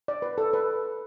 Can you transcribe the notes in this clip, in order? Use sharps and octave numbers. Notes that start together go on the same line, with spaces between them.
D5
B4
A4
B4